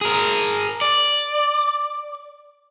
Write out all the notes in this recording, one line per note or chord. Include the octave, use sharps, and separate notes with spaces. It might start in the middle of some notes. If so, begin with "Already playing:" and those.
G#4 A#4
D5